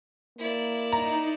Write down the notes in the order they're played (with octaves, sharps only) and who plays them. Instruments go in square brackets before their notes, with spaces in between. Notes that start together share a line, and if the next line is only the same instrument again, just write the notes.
[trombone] A#3 [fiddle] E4 D5
[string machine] D#4 [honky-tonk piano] A#5